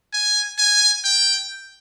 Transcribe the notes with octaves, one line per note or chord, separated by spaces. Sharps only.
G#5
G#5
G5